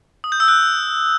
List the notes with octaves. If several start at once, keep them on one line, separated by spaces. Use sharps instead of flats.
D#6
G6
E6
F#6